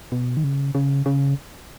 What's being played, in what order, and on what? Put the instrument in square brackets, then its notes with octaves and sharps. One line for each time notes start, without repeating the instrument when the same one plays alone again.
[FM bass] B2
D#3
C#3
C#3
C#3